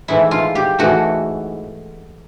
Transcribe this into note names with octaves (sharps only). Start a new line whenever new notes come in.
G#2 E3 A3 E4
F4
G4
G#2 E3 A3 F#4